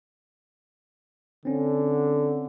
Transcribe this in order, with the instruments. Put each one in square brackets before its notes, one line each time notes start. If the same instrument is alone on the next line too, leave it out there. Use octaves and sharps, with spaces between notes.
[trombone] D3 [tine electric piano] C4 C#4